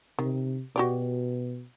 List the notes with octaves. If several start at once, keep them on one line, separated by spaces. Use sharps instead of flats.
C3 D#3
B2 F#4 G4 D5